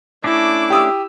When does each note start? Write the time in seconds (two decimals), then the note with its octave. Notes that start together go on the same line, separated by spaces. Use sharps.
0.24 A3 C#4 D4 E4 D6
0.70 G4 D#6 E6